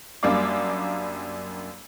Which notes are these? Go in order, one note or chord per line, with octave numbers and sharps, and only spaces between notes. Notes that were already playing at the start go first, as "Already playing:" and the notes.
F#2 G3 A#3 D4 F5 D6